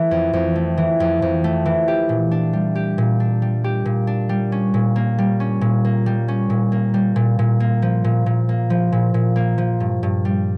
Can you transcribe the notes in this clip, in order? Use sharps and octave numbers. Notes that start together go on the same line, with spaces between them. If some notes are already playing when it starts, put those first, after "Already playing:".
Already playing: E3 A3
F2
F2
A3
E3
F2
F2
A3
E3
G4
A#2
D4
G3
G4
A#2
D4
G3
G4
A#2
D4
G3
C#4
A#2
A#3
G3
C#4
A#2
A#3
G3
C#4
A#2
A#3
G3
A#2
A#2
A#3
F3
A#2
A#2
A#3
F3
A#2
A#2
A#3
F3
G2
G2
G3